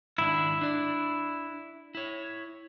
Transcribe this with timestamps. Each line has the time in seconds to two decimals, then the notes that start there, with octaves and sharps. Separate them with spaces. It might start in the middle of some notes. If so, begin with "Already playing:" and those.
0.18 G#2 D#3 D4 E4
0.61 D4 D5
1.95 E4 C#5